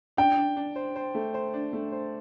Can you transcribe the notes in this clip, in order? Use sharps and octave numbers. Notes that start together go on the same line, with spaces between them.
D4 G5
D4
D4
C5
C5
A3
C5
D4
A3
C5